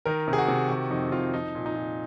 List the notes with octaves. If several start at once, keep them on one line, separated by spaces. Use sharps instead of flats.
D#3 A#4
C3
G#4
F#4
C3
D#3 F#4
F2 D#4
F2 F4
F3 D#4
A#2
D#4
A#2